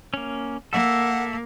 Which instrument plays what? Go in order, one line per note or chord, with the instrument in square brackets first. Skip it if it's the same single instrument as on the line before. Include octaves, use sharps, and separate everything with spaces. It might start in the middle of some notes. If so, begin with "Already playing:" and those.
[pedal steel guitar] A#3 C#4
[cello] A#3 [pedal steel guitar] A4 E5 [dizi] F#5